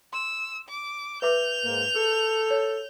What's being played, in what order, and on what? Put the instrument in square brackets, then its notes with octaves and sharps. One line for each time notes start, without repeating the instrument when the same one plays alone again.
[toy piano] C6 [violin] E6
[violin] D6
[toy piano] B4 E5 D6 [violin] G6 F7
[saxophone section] G#2 A#3
[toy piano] G#4 [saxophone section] A4
[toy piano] C#5